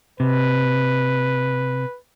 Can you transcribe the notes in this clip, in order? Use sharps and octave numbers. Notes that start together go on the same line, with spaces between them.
C3 B4